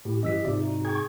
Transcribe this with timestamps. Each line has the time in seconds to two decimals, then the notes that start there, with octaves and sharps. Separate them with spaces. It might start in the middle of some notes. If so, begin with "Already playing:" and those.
0.05 A2 G4
0.23 G2 E3 C#4 D#5 E6 B6
0.45 G#2 C3 D#4 F4 D5 E5
0.67 F#4
0.85 G#4 G5 C#6 G#6